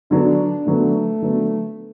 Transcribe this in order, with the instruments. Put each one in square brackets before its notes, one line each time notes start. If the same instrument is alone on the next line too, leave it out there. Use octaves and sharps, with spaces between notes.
[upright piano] D3 F#3 B3 [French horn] D4
[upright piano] D3 F#3 B3 [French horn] A3
[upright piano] D3 F#3 B3